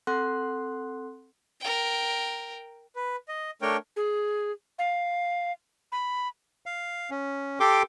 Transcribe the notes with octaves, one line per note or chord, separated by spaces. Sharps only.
C4 A4 F#5 C6 F#6
A#4 G5
B4
D#5
A3 D4 A#4 C#5 G5
G#4
F5
B5
F5
C#4
G4 A4 G5 C6 D6